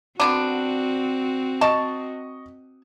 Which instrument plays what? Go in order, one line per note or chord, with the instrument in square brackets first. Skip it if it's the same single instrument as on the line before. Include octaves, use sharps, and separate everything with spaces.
[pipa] D3 B3 D4 [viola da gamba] C4 F#4
[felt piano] D#5 C#6 [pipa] A5